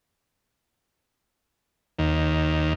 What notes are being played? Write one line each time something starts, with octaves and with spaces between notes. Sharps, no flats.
D#2